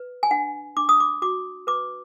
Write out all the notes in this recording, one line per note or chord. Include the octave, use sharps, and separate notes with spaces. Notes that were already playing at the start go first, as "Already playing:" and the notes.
Already playing: B4
G#5
D4 F#5
D4 D6
D#6
D6
F#4 D6
B4 D6